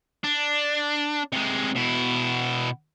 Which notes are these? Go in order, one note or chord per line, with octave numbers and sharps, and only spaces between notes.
D4
C3 G#3
B2 E4